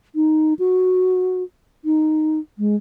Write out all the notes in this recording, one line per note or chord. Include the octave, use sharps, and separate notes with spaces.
D#4
F#4
D#4
G#3